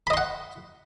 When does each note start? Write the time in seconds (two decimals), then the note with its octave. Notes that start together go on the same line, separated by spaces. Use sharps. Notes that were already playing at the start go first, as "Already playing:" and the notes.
0.07 B5
0.10 D#5
0.14 C6
0.17 F#5